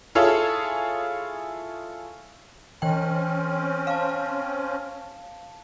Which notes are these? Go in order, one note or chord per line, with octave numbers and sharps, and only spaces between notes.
E4 F4 G#4 A4 C#5 F5
E3 C4 C#4 G5
F5 A5